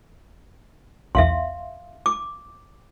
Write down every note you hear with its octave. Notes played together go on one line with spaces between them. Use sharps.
B1 E2 E5 F5 C6
D6